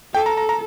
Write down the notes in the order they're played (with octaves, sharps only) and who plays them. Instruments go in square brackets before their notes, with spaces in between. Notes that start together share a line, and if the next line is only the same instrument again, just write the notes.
[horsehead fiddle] A4 [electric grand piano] G5
[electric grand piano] A#5
A#5
A#5